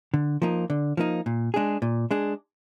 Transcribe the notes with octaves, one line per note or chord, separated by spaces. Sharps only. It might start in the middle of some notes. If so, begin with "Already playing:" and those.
D3
F3 A#3 D#4
D3
F3 A#3 D#4
A#2
G#3 D4 G#4
A#2
G#3 D4 G#4